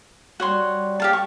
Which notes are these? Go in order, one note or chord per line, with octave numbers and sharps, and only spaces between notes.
G3 F#4 C#5 C6
G4 F5 A5
C#6